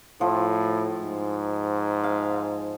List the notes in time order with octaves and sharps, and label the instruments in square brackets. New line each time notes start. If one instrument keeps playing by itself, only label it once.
[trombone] A2 [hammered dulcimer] F3
[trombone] G#2
[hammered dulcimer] F5